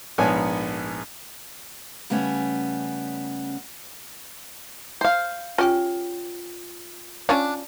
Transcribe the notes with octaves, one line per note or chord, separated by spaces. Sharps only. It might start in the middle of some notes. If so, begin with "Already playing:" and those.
A#1 G#2 B3 C#5 G#5 A5
C#3 G3 A3 B3 C#4
C5 F5
C#4 F4 G4 G5
C#4 D4 F4 C#5